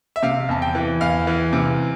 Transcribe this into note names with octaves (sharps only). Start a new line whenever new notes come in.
E5
C3 F5
E2 A5
G5
E3
E2 F5
E3
C3